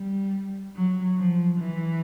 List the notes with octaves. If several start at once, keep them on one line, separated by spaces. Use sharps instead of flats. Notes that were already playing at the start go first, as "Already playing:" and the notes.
Already playing: G3
F#3
F3
E3